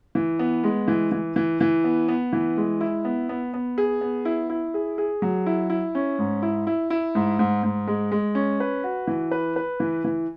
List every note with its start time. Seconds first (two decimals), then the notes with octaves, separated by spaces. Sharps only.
0.15 E3
0.39 B3
0.64 G#3
0.88 E3
1.12 E3
1.36 E3
1.61 E3
1.84 B3
2.08 B3
2.33 E3
2.57 G#3
2.80 E4
3.05 B3
3.29 B3
3.54 B3
3.78 G#4
4.01 B3
4.25 E4
4.50 E4
4.74 G#4
4.98 G#4
5.22 F#3
5.46 E4
5.70 E4
5.95 C#4
6.19 G#2
6.42 E4
6.67 E4
6.90 E4
7.15 G#2
7.39 G#2
7.63 G#2
7.87 G#3
8.12 G#3
8.35 C#4
8.60 B4
8.84 F#4
9.07 E3
9.31 B4
9.56 B4
9.80 E3
10.04 E3